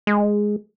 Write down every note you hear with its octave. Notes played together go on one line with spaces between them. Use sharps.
G#3